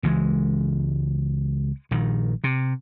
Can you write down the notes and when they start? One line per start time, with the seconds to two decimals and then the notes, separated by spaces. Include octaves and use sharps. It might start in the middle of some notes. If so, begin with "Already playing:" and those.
0.03 C#2 E3 G3 G#3
1.91 A#1 D#3
2.44 C3